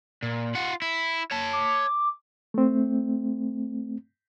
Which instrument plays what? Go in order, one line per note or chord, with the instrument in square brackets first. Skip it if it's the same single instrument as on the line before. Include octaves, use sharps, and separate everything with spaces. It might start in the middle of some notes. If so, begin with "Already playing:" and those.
[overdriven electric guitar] A#2
F4 F#5
E4
C#5 A5
[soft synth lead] D6
[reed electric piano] A3 C4